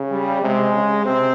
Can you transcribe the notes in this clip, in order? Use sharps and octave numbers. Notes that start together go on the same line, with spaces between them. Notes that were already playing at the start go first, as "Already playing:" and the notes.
Already playing: C#3
G3
C3 G#3
C#3
C3 C4